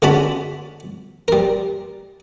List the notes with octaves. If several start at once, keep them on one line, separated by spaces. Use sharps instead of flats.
D3 G#3 C#4 F#4 A5 B5
G3 A#4